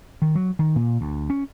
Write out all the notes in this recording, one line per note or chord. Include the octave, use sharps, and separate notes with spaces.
D#3
F#3
D#3
A#2
D2
C#4